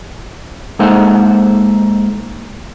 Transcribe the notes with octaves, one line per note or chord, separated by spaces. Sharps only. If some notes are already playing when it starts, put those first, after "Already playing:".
G#3 A#3 D#4 A4 C5 F#5